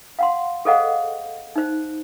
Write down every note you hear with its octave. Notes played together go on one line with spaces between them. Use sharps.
F5 F#5 C6
G#4 A4 C5 D#5 F5 F#5
D#4 C5